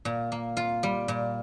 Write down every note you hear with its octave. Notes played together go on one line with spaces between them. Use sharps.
A#2
A#3
F4
G3
A#2